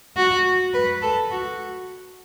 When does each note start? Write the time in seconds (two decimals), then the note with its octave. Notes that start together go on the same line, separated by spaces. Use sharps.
0.17 F#4
0.74 B4
1.02 A4
1.31 F#4